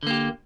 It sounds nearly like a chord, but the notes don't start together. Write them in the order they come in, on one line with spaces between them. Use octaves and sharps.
D3 A#3 G4